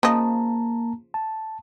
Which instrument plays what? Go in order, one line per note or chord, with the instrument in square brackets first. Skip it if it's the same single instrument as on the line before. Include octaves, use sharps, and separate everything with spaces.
[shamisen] C#3 F3 D#5 [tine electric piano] A#3 A5 A#5
[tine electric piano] A5